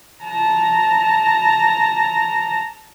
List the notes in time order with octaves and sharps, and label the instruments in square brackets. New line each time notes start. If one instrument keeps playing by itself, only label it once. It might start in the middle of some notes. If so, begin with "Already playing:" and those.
[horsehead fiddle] A5 A#5